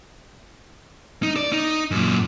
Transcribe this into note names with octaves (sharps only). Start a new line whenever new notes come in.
D#4
D5
D#4
F#2 A#2